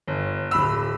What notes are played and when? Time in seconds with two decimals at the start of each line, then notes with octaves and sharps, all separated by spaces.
0.08 G1
0.51 D1 B5 E6